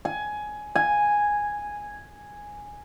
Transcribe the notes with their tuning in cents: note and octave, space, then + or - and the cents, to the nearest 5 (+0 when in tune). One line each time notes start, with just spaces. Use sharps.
G#5 +15
G#5 -5